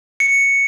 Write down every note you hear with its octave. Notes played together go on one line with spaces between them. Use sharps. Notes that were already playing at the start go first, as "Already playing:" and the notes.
C#7